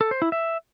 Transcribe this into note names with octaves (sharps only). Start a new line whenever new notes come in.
A4
C5
E4
E5